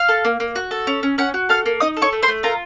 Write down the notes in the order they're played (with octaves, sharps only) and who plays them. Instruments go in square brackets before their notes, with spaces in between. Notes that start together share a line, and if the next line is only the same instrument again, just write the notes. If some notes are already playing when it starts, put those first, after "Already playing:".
Already playing: [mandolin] F5 F6
A4
A#3
A#3
F#4
A4
C#4
C#4
C#4 F#5 F#6
F#4
A4 F5 F6
A#3
D#4 D#5 D#6
A4
C#5 C#6
A3
C5 C6
A3
F4 A#4 A#5